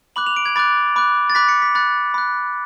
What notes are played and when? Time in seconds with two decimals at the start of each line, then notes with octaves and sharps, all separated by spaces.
0.16 B5 D6 F#6 F#7
0.27 F7
0.36 D7
0.46 G#6
0.56 B5 D6 F#6 A6
0.96 B5 D6 F#6
1.30 A6
1.35 B5 D6 F#6 B6
1.49 C#7
1.62 B6
1.75 B5 F#6 A6
2.14 B5 F#6